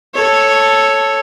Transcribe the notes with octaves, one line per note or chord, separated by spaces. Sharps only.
A4 C#5